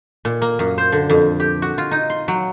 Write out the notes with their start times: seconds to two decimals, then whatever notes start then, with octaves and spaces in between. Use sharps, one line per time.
0.25 A#2
0.42 A#3
0.59 F#2
0.78 C5
0.92 D3
1.10 F2
1.40 G4
1.62 F#4
1.78 F4
1.91 D#4
2.10 C6
2.28 F#3